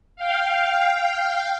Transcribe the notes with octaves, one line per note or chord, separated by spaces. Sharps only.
F5 G5